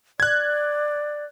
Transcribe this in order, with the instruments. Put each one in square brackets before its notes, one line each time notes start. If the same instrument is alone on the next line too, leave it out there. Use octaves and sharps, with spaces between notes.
[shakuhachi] D5 [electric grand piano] F#6 G#6